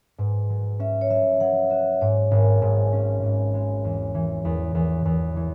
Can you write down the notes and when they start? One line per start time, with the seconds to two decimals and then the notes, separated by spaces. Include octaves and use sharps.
0.18 G#2 B4
0.50 F#3
0.79 C#4 E5
1.01 C#5
1.10 F#3 E5
1.40 F#3 F#5
1.70 F#4 E5
2.01 G#2 C#5
2.31 G#1
2.62 G#2
2.93 C#4
3.23 G#2
3.54 G#3
3.85 E2
4.15 E3
4.45 E2
4.75 E2
5.05 E2
5.36 E3